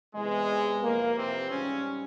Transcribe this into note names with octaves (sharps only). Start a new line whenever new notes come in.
E2 C3 E3 G#3
F2 C3 E3 A#3
C3 C4
G#2 C#3 G3 C#4